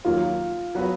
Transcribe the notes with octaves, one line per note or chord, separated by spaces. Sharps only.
D#2 D#3 F#3 A#3 F4
F#3 B3 F#4 B4